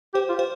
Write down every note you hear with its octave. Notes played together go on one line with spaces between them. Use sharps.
G4 C5
F4
C5